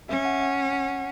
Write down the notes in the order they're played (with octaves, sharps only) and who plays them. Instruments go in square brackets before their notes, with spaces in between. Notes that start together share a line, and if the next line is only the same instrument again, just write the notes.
[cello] C#4 [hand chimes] E5
[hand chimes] F#5
F#5
F#5